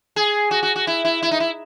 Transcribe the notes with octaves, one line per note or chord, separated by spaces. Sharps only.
G#4
F#4
F#4
F#4
E4
E4
E4
D#4
E4